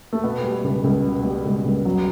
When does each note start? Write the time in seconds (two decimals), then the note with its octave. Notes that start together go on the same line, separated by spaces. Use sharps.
0.13 A3
0.24 B2 B3
0.43 G3
0.64 C#2
0.84 C#2
1.04 B2
1.24 G3
1.45 C#2
1.65 C#2
1.85 F#3